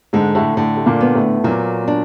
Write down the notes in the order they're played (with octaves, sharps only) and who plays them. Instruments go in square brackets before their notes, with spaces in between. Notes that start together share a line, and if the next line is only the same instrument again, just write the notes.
[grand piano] G#2 G#3 [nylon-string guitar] D3
[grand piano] A2 A3
[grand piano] A2 A3 [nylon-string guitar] D3
[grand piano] A3
A#2 A#3
[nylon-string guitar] B3
[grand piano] A2 A3
[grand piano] A#2 A#3 [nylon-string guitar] F#3
[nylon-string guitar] D4